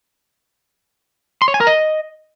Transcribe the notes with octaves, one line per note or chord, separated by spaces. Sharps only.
C6
C#5
G#5
A#4
D#5